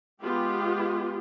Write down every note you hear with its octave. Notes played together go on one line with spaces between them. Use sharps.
G#3 B3 F4 G4